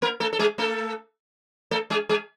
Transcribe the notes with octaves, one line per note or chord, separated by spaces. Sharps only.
A#3 A#4
A3 A4
A4
G#3 G#4
A3 A4
A3 A4
G#3 G#4
G#3 G#4